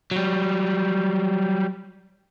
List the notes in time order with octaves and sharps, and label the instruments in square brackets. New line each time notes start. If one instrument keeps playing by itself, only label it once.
[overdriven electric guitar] F#3 G3